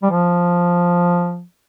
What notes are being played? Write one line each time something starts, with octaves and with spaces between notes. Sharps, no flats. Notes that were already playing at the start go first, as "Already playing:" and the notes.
G3
F3